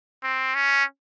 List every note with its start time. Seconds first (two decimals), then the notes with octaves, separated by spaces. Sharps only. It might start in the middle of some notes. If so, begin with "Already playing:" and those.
0.23 C4
0.55 C#4